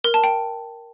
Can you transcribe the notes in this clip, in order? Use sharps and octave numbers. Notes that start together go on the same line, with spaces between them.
A#4
A5
G5